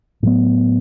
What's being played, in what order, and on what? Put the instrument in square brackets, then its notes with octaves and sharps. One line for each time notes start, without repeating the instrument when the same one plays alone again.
[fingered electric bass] A2 F#3 B3